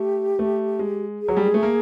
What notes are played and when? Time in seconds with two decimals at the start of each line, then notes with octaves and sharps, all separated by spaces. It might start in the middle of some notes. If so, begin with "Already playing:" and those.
Already playing: A3 G4
0.39 A3
0.79 G#3
1.22 G#4
1.28 F#3
1.37 G3
1.46 G#3
1.54 A3
1.63 A#3